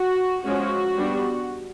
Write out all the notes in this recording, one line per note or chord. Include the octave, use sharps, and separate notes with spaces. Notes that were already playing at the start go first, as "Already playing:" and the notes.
Already playing: F#4
F3 G#3 C#4 F#4
G3 B3 D4